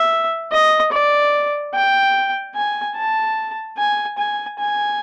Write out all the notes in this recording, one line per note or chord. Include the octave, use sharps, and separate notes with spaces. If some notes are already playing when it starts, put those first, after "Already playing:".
Already playing: E5
D#5
D5
G5
G#5
A5
G#5
G#5
G#5